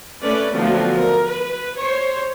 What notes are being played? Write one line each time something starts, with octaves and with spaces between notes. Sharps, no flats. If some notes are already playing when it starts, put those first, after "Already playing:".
A3 C#4 B4 D5
D3 F3 F#3 A3 B3 C4
A#4
B4
C5 C#5